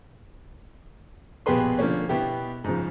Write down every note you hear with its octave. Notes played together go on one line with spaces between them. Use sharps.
A#1 B2 G4 G#4 B4 C6
D3 F3 A#3 C#4
B2 B3 E4 G4
G#2 C#3 F3